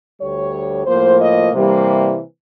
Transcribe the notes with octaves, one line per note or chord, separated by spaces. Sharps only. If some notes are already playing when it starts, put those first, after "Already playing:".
D2 D3 G3 C#5
A2 F3 A#3 C5
D#5
C3 E3 G3 A#3